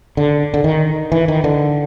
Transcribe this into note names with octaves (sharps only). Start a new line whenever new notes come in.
D3
D3
D#3
E3
D#3
D3